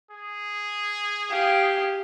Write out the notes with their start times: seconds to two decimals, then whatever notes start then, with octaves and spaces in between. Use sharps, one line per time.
0.11 G#4
1.31 G4 F5